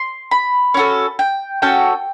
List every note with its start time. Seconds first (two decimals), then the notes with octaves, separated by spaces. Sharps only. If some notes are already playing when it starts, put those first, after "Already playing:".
Already playing: C6
0.31 B5
0.74 C#4 F#4 A4
1.19 G5
1.62 C#4 F#4 A4 G5